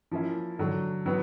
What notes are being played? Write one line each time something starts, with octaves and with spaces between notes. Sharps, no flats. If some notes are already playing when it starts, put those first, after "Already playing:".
F3 A#3 C#4 E4
D3 F#3 A3
F#3 B3